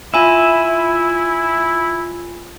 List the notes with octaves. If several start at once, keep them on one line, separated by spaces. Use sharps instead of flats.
E4 F4 E5 G#5 B5